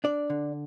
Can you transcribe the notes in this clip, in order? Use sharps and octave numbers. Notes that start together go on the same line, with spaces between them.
D4 D5
D3